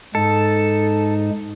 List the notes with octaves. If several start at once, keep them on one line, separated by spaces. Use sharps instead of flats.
G#2 D#4 A4